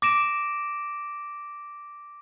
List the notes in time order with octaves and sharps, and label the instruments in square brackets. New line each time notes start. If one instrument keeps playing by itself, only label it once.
[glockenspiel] D6 A#6 D7 E7